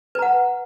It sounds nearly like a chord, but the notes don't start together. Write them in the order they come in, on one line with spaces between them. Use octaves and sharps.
B4 A#5 F#5